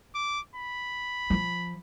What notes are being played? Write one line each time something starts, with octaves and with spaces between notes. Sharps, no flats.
D6
B5
F3